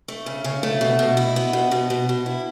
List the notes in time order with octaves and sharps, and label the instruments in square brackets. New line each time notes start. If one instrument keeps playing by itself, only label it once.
[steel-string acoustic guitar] A3
C#3
C#3
A3
B2
B2
E4
B3
B2
B2
B2
B2
E4